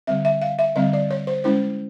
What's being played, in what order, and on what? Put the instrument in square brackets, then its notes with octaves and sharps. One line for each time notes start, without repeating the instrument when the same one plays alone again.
[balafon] D3 G3 C4 E5
E5
F5
E5
D3 G3 C4 D#5
D5
C#5
C5
G#3 C#4 E4 C5